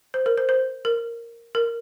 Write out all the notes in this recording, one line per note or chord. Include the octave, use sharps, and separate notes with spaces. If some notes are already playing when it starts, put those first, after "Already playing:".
C5
A#4
C5
C5
A#4
A#4